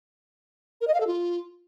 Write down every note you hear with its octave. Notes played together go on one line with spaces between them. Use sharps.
A#4
D#5
F5
A4
F4